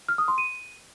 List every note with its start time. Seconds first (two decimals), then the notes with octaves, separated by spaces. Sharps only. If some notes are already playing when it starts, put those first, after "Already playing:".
0.08 F6
0.18 D#6
0.28 C6
0.38 D#7